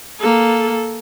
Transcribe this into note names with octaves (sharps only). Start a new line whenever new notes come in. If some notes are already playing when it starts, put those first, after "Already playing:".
A#3 A4